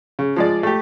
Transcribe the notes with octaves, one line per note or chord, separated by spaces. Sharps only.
C#3
F3 G#3 D5
A3 G4